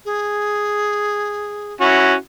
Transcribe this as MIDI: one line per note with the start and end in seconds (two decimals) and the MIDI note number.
0.05 1.74 68
1.81 2.14 61
1.81 2.14 64
1.81 2.14 66